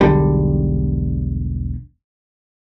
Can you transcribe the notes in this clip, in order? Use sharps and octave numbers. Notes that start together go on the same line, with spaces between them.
E1 B1 D3 G3